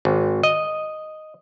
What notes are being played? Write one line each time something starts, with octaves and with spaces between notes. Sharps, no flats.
G#1
D#5